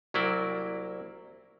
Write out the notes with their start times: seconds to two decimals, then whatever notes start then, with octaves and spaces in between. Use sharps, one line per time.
0.14 C2 F#3 A#3 E4 D5 G5